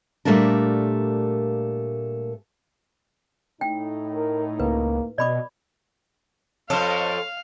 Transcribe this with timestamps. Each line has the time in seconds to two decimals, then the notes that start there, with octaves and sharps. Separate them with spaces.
0.25 A#2 G3 A3 A#3 D4 A#4
3.61 A2 D#4 G5
4.15 A#4
4.60 C#2 A#3 B4
5.18 B2 D5 D#5 B5 D6
6.70 F2 A4 C5 C#5 F5